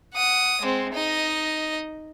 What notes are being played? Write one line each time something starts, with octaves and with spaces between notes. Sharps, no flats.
F#5 D#6
G#3 C4
D#4 D#5